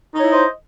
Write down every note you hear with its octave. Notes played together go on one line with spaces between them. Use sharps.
D#4 E4 C5 C#5 D#5